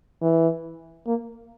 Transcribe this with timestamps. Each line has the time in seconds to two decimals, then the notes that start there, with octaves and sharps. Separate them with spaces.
0.22 E3
1.07 A#3